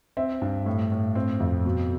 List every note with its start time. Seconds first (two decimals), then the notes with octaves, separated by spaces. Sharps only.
0.17 C4 E5
0.42 G2
0.66 A2
0.92 A2
1.15 C4
1.40 F2
1.65 B2